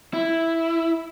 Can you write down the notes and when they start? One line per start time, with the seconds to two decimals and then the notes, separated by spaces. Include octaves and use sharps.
0.13 E4